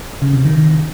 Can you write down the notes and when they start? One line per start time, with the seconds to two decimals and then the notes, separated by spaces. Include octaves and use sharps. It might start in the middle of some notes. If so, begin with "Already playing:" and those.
0.22 C#3
0.33 C3
0.45 D#3